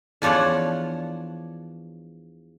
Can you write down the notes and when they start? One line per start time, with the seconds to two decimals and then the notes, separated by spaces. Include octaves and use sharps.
0.22 E2 F3 D4 C#5 F#5